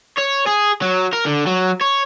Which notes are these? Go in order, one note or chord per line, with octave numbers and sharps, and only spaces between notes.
C#5
G#4
F#3
A#4
D3
F#3
C#5